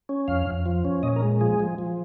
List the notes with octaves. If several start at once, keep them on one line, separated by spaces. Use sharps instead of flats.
C#4
F2 F5
F2
F3
C#4
A#2 D#5
A#4
G#3
F3 G#4
F3
F3